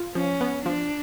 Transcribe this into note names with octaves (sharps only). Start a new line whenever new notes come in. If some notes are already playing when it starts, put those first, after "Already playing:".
Already playing: F4
F3 C#4
B3
F3 D4